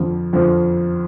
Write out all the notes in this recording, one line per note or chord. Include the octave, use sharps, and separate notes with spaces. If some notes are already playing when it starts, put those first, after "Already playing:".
Already playing: F2 D3 F3
F2 D3 F3